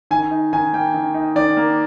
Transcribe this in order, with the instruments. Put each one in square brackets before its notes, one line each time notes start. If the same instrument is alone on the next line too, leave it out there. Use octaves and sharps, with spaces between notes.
[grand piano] D#3 G#5
D#4
D#3 G#5
A#3 G5
D#3
D#4
D#3 D5
A#3